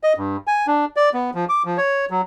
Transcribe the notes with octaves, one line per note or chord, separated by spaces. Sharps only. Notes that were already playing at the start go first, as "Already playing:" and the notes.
D#5
G2
G#5
D4
D5
B3
F3
D6
F3
C#5
F#3